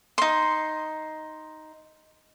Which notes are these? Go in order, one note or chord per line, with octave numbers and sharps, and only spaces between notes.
D#4 C6